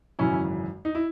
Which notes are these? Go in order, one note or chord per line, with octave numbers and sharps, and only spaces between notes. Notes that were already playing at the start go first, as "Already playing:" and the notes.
G#1 F#2 C#3 E3 C#4 E4
D#4
E4